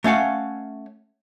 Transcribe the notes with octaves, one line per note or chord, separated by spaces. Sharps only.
A3 C#4 F5 F#5